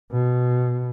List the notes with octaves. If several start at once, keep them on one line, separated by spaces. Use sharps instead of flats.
B2